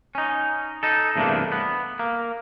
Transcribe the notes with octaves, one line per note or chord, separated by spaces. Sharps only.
C#4 D#4
D#4 A4
E2 G2 C3 A3 A#3 D4
B3
A#3